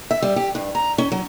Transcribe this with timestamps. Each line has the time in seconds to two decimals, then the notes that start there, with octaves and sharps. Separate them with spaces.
0.11 E5
0.22 G3
0.36 G4
0.55 G2
0.75 A#5
0.98 C#4
1.12 F#3